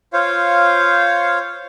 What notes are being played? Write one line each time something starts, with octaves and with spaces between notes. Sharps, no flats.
F4 C5 C#5 F5